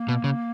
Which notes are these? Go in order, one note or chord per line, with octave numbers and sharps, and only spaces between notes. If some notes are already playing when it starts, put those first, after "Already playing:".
Already playing: A#3
B2
C#3